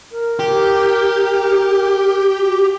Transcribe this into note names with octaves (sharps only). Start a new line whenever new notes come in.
A#4
G4
F#4